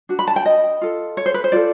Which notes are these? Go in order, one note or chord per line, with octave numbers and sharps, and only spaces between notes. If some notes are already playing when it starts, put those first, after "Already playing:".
D4 F#4
B5
A5
G5
D#5
F4 A4
C#5
C5
B4
C5
F4 A4 D5